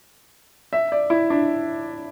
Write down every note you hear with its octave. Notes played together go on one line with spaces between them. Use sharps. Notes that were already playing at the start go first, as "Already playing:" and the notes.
E5
D5
E4
D4